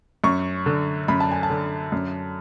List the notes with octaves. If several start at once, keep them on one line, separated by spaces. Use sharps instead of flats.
F#2 C#6
D3
F#2 B5
A5
G#5
A5
D3
F#2